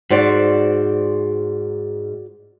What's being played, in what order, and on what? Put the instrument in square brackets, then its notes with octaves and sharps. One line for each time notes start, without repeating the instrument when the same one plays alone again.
[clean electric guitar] G#2 [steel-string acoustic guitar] F#4 C5 D5